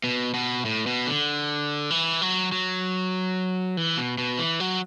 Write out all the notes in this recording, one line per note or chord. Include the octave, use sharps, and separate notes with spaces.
B2
B2
A2
B2
D3
E3
F#3
F#3
E3
B2
B2
E3
F#3